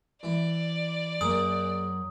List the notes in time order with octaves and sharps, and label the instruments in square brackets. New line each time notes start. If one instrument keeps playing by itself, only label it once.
[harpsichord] E3 E4 [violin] D5
[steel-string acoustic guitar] F#2 [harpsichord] A#3 G#4 [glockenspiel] D#6